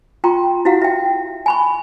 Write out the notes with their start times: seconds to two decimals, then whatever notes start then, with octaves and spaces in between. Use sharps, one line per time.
0.24 F4 G5 A#5 C6 C#6
0.65 E4 F#4 G4 F5 F#5
0.82 E5 G5
1.46 G#5 B5 C#6